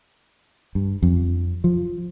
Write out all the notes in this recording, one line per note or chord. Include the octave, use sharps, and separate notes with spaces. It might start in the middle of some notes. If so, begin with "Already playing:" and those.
G2
F2
F3